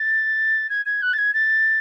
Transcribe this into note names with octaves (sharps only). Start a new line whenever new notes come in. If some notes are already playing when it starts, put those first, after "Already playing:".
Already playing: A6
G#6
G#6
F#6
A6
G#6
A6